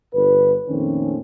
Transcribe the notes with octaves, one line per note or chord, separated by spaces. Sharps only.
G1 B4
F2 A#2 D#3 A3 C4 C#4